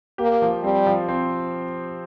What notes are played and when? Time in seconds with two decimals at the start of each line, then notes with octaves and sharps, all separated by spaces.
0.18 A#3 G4
0.42 F3
0.63 G3 C4
0.87 F3
1.08 C4